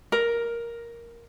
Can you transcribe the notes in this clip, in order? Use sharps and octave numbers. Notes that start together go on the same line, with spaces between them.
A#4